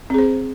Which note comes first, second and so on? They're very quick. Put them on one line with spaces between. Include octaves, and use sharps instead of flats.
C4 G#4 C5